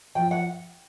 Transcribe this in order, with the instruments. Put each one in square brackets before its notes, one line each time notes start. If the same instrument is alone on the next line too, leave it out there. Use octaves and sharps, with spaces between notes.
[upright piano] F3 [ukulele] G5
[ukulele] F#5